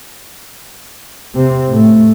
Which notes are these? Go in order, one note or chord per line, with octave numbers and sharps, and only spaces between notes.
C3 C4
A2 A3